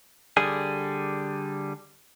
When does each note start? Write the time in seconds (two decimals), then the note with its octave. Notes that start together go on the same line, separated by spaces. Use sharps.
0.37 D3 G3 G#4